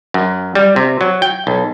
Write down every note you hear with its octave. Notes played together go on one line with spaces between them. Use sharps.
F#2
G3
C3
F#3
G5
B1